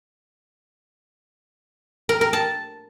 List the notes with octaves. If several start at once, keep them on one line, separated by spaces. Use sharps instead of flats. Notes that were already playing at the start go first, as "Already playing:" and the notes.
A#4
A#4
A5